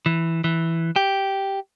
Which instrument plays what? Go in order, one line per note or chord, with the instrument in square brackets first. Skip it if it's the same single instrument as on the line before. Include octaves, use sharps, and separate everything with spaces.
[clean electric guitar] E3
E3
G4